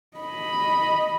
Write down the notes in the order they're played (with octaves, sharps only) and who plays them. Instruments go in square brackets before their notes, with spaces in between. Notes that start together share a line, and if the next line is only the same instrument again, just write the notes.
[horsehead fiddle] D#5 B5